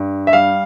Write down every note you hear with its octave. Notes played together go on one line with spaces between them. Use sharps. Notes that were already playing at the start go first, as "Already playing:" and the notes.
Already playing: G2
E5
G3 F5